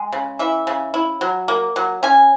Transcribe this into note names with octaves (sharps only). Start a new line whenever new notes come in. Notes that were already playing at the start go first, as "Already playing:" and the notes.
Already playing: G#3
C#3
E3 E5
C#3
E4
F#3
A#3
F#3
C#4 G#5